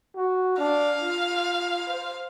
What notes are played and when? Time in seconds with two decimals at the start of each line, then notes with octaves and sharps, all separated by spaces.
0.16 F#4
0.58 D4 F5
1.02 F4
1.88 C5